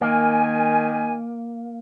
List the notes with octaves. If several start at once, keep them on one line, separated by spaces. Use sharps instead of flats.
D#3 A#3 G#5